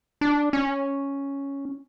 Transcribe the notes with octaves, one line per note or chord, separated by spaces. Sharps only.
D4
C#4